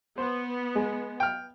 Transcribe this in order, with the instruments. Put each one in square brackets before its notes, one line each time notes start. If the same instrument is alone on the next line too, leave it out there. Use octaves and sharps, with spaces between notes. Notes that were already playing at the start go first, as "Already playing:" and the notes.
[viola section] B3 [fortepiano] C5
[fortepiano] G#3
G5 F6